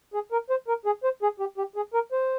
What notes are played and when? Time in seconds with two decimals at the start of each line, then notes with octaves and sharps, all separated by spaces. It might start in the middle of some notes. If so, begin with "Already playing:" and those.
0.14 G#4
0.32 A#4
0.50 C5
0.68 A#4
0.86 G#4
1.04 C5
1.23 G#4
1.40 G4
1.58 G4
1.76 G#4
1.94 A#4
2.12 C5